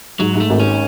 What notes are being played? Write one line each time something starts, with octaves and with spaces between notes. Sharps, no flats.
G#2 F#3
G#2 A3
G#1
C#4